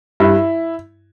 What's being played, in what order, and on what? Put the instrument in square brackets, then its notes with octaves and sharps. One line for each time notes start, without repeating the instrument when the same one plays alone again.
[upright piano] G2 E4